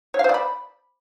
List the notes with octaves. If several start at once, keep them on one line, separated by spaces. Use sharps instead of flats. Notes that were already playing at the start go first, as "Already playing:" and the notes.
C#5
F5
C5
D5
B5